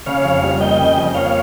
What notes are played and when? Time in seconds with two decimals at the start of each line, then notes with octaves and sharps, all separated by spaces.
0.06 C#3 C#5 F5
0.25 F2
0.43 G3
0.60 A#3 D#5 G5
0.79 C#3
0.97 F2
1.15 A#3 C#5 F5